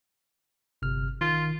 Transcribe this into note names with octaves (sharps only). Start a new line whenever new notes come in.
G1 C3 F6
D#3 F4